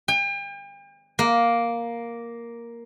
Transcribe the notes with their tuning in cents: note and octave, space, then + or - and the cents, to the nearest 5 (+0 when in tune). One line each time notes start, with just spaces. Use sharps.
G5 +40
A#3 +5